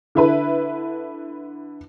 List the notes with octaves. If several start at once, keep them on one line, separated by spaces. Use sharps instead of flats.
D3 E4 B4